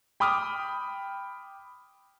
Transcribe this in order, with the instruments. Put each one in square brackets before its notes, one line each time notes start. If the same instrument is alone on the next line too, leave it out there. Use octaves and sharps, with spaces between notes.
[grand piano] G5 B5 D6 D#6 F6